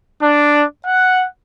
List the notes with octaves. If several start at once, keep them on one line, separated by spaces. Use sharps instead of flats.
D4
F#5